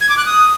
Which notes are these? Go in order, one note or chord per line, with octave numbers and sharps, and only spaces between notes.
G#6
D6
F#6
D#6